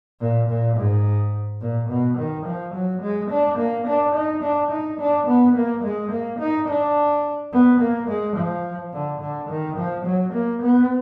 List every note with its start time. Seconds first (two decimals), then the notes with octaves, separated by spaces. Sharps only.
0.21 A#2
0.49 A#2
0.78 G#2
1.61 A#2
1.90 B2
2.18 D#3
2.46 F3
2.74 F#3
3.02 G#3
3.31 D4
3.58 A#3
3.87 D4
4.15 D#4
4.43 D4
4.71 D#4
5.00 D4
5.28 B3
5.56 A#3
5.84 G#3
6.12 A#3
6.39 D#4
6.69 D4
7.53 B3
7.80 A#3
8.08 G#3
8.37 F3
8.93 D3
9.21 D3
9.50 D#3
9.77 F3
10.05 F#3
10.34 A#3
10.62 B3